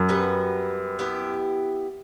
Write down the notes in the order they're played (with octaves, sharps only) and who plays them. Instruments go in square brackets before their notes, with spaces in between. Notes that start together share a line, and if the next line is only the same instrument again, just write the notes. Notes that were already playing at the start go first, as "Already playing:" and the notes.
Already playing: [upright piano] F#2
[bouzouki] G3 B3 F#4 B4
B3 E4 G4